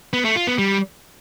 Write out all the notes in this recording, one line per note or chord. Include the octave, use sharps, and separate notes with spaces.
B3
A3
F4
B3
G3